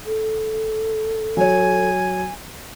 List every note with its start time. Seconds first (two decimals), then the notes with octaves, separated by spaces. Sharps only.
0.06 A4
1.37 F#3 C#5 G#5